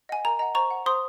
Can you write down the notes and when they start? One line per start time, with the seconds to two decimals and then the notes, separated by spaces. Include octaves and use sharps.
0.09 D#5 F#5 G#5
0.25 A#4 A#5
0.39 D#5 F#5 A#5
0.55 C5 A#5 C#6
0.70 F#5
0.86 C5 C6 D#6